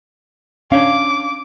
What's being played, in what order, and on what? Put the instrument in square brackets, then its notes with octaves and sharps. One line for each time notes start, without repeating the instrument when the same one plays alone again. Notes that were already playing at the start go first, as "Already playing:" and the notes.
[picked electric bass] C#4 [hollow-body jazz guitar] D4 C#5 F5 [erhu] D6